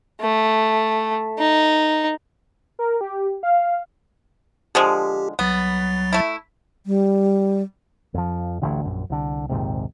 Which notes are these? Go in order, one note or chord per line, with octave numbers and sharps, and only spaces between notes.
A3
D#4
A#4
G4
F5
D3 F3 G#3 G4
C2 F#3 B3 A6
A3 E4
G3
F2 F3
A1 D2 D3
A#1 F#2
C2 D3
A#1 D#2 G#2 C3